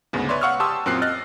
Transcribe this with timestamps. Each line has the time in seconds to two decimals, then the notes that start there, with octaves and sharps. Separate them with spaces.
0.13 D2 G#2 C#3 B3
0.29 B4 C#5 D5 E5 C6
0.41 F5 F#5 C#6 E6 F6
0.60 G4 A5 C6 D#6 E6
0.86 F#2 A#2 C4 F#6 C7
1.02 D#5 F6 F#6 A6